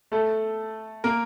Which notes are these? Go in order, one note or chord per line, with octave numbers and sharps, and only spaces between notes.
A3 A4
A#3 A#4